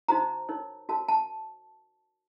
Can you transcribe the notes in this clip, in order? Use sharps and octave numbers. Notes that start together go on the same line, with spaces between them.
D#4 F#4 C5 A#5
D#4 A#4 C#5
F#4 A#4 C#5 A5
A5